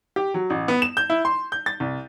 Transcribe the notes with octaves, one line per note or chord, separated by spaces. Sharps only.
G4
F#3
A1
B3
E7
G6
E4
C6
G6
A6
C2